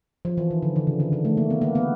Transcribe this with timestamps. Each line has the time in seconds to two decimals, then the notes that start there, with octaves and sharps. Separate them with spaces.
0.25 F3
0.38 E3
0.51 D#3
0.62 D3
0.76 D3
0.87 C#3
1.00 D3
1.13 D#3
1.25 A3
1.37 A#3
1.50 B3
1.62 A#3
1.75 B3